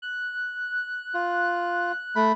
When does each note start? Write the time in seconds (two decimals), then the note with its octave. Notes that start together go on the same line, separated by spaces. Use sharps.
0.02 F#6
1.14 F4
2.16 A3 B5